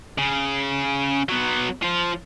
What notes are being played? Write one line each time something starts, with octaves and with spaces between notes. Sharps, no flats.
C#3
F#3 B3
F3 F4